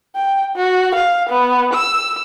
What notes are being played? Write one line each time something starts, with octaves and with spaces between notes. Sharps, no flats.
G5
F#4
F5
B3
E6